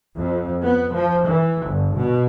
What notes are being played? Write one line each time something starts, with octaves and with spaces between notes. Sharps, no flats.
F2
B3
F3
E3
G1
B2